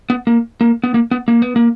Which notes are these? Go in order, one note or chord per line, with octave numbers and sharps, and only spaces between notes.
B3
A#3
A#3
B3
A#3
B3
A#3
B3
A#3